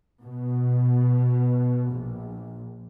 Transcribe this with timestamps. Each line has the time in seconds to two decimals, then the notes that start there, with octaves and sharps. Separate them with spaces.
0.22 B2
1.89 A#1